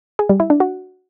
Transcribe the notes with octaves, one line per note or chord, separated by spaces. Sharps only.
G#4
G3
E4
D4
F#4